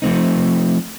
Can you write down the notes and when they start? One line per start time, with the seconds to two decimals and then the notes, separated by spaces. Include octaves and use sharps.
0.02 F3 A3 C4 D#4